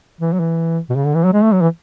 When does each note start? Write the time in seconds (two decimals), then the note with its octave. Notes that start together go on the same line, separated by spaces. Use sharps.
0.20 E3
0.33 F#3
0.40 E3
0.90 B2
0.96 C#3
1.06 D3
1.15 E3
1.25 F#3
1.33 G#3
1.43 A3
1.52 F#3
1.61 E3